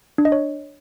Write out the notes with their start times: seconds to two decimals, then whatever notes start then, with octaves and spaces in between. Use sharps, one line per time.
0.18 D4
0.25 D#5
0.32 C#5